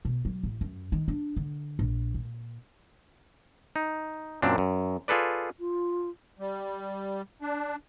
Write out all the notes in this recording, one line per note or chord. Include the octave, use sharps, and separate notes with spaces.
B2
F#3
A1
F#2
D#3
D4
D3
A#1
A#2
D#4
F#2 A#2 C4 D4
F#2
F4 G#4 A4 B4 D5
F4
G3
D4